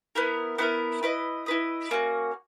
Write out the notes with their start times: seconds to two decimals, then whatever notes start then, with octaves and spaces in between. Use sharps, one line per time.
0.15 B3 E4 A#4
0.58 B3 E4 A#4
1.03 E4 B4 D#5
1.46 E4 B4 D#5
1.91 A#3 C#4 F#4